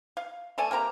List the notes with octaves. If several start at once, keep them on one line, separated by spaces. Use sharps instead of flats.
F5
A3 A4 D5 G#5
A#3 C4 G4 A#5